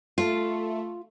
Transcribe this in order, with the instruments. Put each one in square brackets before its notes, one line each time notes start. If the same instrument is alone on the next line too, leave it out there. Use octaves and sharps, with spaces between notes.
[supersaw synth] A3 [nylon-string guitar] F4